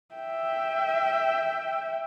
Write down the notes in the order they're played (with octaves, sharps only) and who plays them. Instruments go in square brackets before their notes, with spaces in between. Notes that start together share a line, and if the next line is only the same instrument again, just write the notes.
[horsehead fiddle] E5 G5